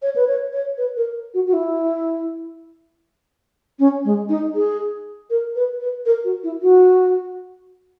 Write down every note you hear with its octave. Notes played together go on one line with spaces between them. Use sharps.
C#5
B4
C#5
C#5
B4
A#4
F#4
F#4
E4
C#4
G#3
D#4
G#4
A#4
B4
B4
A#4
F#4
E4
F#4